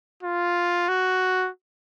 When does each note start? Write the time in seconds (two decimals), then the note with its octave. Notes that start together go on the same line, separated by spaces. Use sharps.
0.23 F4
0.88 F#4